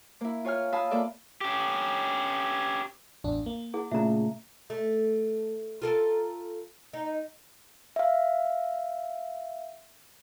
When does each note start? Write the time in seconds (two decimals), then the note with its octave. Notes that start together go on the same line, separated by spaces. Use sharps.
0.21 A#3 E4
0.45 F4 C#5 G#5 F6
0.72 F5 G#5 A5 B5 D#6 E6
0.91 A#3 F4 A4 D5 E5
1.41 C#4 G4
3.24 A1 E2 D4
3.46 A#3
3.74 E4 G#4 F#5
3.92 A#2 C#3 A3 E5 A#5
4.70 A3
5.82 F4 A4 A#4
6.93 D#4
7.96 E5 F5